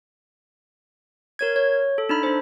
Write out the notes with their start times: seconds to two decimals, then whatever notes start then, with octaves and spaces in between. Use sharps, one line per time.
1.39 A#4 C#5 G#6
1.56 C#5
1.98 A4
2.09 D4 D#4 B5
2.23 D4 C5